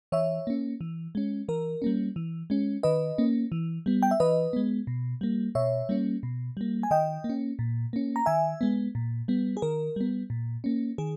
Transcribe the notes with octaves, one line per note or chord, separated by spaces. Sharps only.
E3 C#5 E5
A#3 C#4
E3
G#3 C#4
E3 A#4
G3 A#3 C#4
E3
G#3 C#4
D#3 B4 D#5
A#3 C#4
E3
G3 B3
G5
E5
E3 B4 D#5
G#3 B3
B2
G3 A#3
B2 C#5 E5
G3 A#3 C#4
B2
G3 A#3
G#5
D#3 D#5 G5
A#3
C#4
A#2
A#3 C#4
A#5
D#3 E5 G#5
G#3 B3
A#2
G3 B3
G#4
D#3 A#4
G3 B3
A#2
A#3 C#4
D#3 G#4